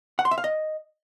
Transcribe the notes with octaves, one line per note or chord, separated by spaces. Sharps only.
F#5
C6
E5
F5
D#5